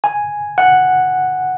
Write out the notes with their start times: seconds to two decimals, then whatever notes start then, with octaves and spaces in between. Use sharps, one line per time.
0.04 G#5
0.58 F#5